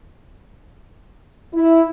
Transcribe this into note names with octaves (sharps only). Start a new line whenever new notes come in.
E4